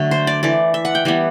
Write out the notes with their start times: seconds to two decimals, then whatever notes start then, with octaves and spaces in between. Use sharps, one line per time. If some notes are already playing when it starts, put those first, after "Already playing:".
Already playing: D3 F#3 A3
0.11 C5
0.27 D5
0.43 E3 A3 D5
0.74 E5
0.85 F#5
0.95 G5
1.05 E3 G3 B3